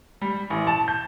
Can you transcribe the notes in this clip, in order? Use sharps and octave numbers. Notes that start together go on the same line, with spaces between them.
G3
A1
A5
G6